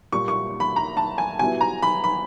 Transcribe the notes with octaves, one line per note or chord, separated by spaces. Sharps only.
A#2 G3 A#3 C#6
C#6
B5
A#5
A5
G#5
B2 G3 B3 E4 G#5
A#5
B5
B5